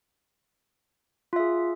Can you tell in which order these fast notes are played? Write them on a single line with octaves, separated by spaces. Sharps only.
F4 E5 G#4